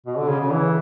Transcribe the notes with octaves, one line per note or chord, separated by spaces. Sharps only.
B2
D3
C#3
C#3
E3